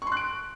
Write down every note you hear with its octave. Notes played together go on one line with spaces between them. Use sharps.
C#6
C6
F#6
D7